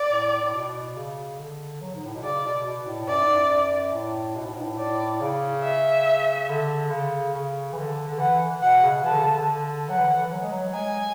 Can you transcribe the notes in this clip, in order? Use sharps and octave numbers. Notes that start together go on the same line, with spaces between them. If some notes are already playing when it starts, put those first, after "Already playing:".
Already playing: D5
A2
A2
B2
C#3
D3
F#3
G#2
A2
B2
C#3 D5
B2
B2
A2
F#2 D5
G#2
F#2
A2
B2
A2
G#2
A2
A2 D5
C#3
E5
D3
C#3
C#3
E3
D3
D3
E3 F#5
B2 F#5
C#3
E3 A5
D3
C#3
D3
F#3 F#5
E3
D3
E3
F#3
G#3
F#3
G#3 G#5